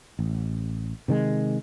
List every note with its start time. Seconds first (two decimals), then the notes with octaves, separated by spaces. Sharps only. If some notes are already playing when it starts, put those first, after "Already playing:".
0.19 A1
1.08 C3 D#3 G3 G#3